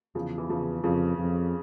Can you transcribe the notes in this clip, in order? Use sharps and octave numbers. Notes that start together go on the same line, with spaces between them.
E2 C#3 F3
E3
C#3 F3
F2 C#3 F3
F2